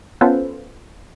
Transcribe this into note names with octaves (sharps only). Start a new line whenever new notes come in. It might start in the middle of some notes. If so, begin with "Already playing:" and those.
B3 C#4 F4 A4 B4 C5